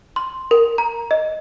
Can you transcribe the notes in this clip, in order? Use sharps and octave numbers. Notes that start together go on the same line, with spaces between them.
C6
A#4
A#5
D#5